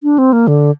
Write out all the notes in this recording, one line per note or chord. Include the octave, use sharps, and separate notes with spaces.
D4
C4
A#3
D3